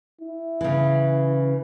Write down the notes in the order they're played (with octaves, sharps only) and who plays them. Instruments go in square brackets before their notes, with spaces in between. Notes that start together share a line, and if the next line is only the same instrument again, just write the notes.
[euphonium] E4
[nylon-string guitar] C#3 E3